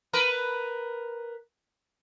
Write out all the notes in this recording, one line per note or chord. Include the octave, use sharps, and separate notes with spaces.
A#4 B4